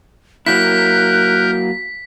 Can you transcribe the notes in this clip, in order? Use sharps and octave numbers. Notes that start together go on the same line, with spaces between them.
F#3 A#3 E4 A#4 F#6 G6 B6